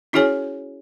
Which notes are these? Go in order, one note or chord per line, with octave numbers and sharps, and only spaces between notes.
C#4 E4 F#4 G#4 C#5 G#5